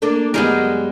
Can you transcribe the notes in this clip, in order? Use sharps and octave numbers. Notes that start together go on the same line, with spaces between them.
A#3 D4 A4
F#2 G3 G#3 B3 G#4 A#4